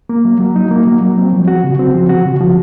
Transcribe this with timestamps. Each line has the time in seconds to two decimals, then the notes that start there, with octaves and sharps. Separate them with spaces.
0.09 A#3
0.25 F#3
0.41 F#3
0.56 D#4
0.71 A#3
0.87 F#3
1.02 F#3
1.18 C4
1.33 F3
1.48 F#4
1.64 C#3
1.79 C4
1.94 F3
2.09 F#4
2.25 C#3
2.41 F3